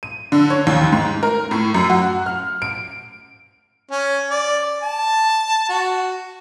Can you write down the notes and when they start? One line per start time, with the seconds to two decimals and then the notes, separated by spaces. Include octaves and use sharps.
0.03 D#7
0.32 D3
0.50 C#5
0.67 D#2
0.92 G#2
1.23 A#4
1.51 A2
1.74 F#2
1.90 F#4
2.26 F6
2.62 D7
3.91 C#4
4.30 D5
4.83 A5
5.69 F#4